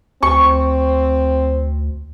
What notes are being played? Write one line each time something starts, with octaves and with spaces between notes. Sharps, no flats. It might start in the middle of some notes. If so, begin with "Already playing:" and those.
D2 C4 C#6